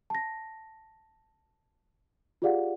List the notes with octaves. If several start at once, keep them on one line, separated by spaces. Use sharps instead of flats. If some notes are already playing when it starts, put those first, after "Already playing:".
A5 A#6
F4 G4 G#4 D5 F5 F#5